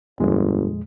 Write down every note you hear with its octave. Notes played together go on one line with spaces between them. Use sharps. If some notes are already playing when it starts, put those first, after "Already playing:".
G1 F2 A#2 G#3